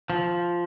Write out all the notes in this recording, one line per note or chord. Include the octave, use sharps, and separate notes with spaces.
F3